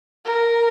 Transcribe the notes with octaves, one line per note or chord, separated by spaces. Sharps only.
A#4